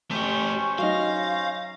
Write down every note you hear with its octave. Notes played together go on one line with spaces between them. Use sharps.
A3 C#4 G4 C5 C#6
F#3 D#4 F5 A#6